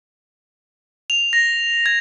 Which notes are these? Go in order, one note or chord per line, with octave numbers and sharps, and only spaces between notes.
F7
A#6
G#6